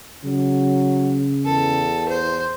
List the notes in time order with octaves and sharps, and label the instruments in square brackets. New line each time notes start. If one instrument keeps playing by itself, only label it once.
[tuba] C#3 [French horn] F#3
[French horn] E2 [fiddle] A4
[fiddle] C5